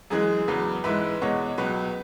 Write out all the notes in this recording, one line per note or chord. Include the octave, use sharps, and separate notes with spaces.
F#2 E3 G#3 G#4
E2 C#3 F#3 B4
G#2 E3 G#3 B4 E5
E2 B2 G#3 C#5 F#5
C#2 B2 F#3 B4